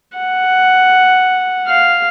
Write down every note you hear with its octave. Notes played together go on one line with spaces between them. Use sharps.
F#5
F5